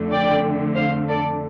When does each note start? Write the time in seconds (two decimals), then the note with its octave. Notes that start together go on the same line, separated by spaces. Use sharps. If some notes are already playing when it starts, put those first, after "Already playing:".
Already playing: F2 D3 A3
0.11 D5 G5
0.75 C5 F5
1.08 A4 D5